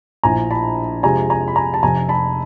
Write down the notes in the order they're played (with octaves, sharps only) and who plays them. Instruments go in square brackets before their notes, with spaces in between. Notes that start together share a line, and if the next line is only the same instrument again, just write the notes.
[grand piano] A#1 A2 F3 G#5 A#5
A5 B5
F2 C3 F3 G#3 G#5 A#5
G#5 A#5
B5
G#5 A#5
A5
F1 F2 C3 G#5 A#5
A5 B5